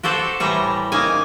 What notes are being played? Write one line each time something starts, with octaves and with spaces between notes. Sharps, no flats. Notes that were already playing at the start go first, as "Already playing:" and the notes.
F#4 G4 A4 C5 D5
A2 E3 G3 A#5
C#3 A#3 D#4 G#5